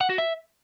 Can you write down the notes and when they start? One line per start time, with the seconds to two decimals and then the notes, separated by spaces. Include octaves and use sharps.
0.01 F#5
0.09 F#4
0.18 E5